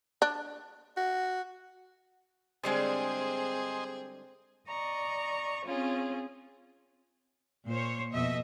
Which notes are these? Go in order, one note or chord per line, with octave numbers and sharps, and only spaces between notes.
D4
F#4
D3 G3 G#3 C4 G#4 C5 D#5 G#5
D5 D#5 A#5 C#6
C4 C#4 F4 G#4
A#2 C5 C#5
F2 B2 D#5 E5